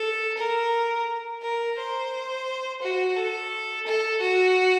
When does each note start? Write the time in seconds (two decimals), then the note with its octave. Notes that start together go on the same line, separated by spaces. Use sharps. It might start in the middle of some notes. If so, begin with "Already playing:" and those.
Already playing: A4
0.38 A#4
1.42 A#4
1.78 C5
2.82 F#4
3.17 A4
3.87 A4
4.21 F#4